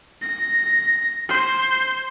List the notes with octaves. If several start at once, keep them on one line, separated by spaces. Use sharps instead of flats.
A#6
C5